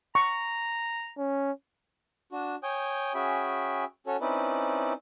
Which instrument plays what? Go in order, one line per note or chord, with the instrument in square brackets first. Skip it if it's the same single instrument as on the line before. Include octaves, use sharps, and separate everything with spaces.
[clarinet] A#5 [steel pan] C#6
[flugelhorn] C#4
[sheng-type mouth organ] D4 F#4
C#5 G5 G#5 D#6 G6
C#4 F#4 G#4 E5 G5 B5
C#4 F#4 A4 C#5
C4 C#4 D#4 E4 B4 D5